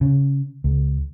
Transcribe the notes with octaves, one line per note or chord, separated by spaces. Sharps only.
C#3
C#2